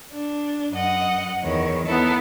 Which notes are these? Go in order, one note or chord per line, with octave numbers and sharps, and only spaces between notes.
D4
F#2 D#5 F#5
E2 D#3 C#5
B3 D#4 E4 A4